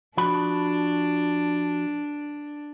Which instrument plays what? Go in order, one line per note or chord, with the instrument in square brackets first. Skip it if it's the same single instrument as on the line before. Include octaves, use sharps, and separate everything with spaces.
[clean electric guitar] F3 F#4 B5 [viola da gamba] D4